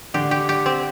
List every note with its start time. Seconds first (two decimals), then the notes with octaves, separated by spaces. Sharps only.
0.14 D3 D4 G4
0.31 G4
0.49 G4
0.66 C4